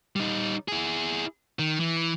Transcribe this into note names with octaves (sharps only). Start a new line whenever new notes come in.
G3 D#4
E4 G#4
D#3
E3